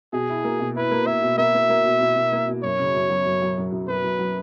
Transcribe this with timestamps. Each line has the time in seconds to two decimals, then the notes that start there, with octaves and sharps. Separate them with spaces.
0.13 B2 G#4
0.29 E4
0.44 A#3
0.60 B2
0.76 E4 B4
0.91 A#3
1.07 A#3 E5
1.22 B2
1.38 A#3 E5
1.55 A#3
1.69 A#3
1.85 B2
2.01 B2
2.16 B2
2.32 A#3
2.48 B2
2.63 F#2 C#5
2.79 C#3
2.95 F#2
3.10 F#3
3.26 F#2
3.42 F#3
3.58 F#2
3.72 F#2
3.88 F#2 B4
4.04 F#2
4.19 F#3